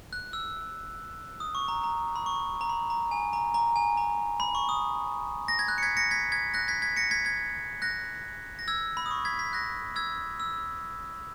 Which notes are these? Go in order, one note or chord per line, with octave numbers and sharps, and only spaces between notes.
F#6
E6
D#6
C#6
A#5
A#5
B5
C#6
A#5
B5
A#5
G#5
A#5
A#5
G#5
A#5
B5
C#6
D#6
A#6
G#6
F#6
C#7
G#6 B6
A#6 C#7
G#6 B6
G#6 B6
F#6 A#6
G#6 B6
G#6 B6
A#6 C#7
G#6 B6
G#6 B6
F#6 A#6
A#6
E6 G#6
B5
D#6
C#6
G#6 B6
G#6 B6
F#6 A#6
E6 G#6
E6